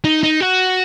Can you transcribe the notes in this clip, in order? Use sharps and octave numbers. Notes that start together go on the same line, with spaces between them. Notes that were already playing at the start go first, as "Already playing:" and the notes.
D#4
D#4
F#4